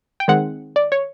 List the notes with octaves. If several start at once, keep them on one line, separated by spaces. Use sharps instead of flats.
G5
D#3 G#3 C4 F#5
D5
C#5